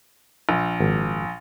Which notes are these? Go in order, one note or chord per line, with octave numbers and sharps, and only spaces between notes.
A#1
G#1